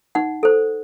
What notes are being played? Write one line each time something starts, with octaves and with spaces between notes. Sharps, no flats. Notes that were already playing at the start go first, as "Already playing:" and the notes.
D#4 F#5
A4 C5